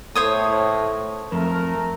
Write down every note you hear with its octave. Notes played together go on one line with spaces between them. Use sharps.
A2 C5 C#5 D#6
F2 A3 A#4